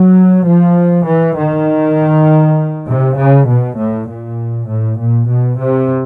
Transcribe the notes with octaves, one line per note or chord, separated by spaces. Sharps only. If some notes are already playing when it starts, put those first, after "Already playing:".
Already playing: F#3
F3
E3
D#3
C3
C#3
B2
A2
A#2
A2
A#2
B2
C3